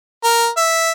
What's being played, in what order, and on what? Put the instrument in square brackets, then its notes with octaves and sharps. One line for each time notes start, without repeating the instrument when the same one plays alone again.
[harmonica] A#4
E5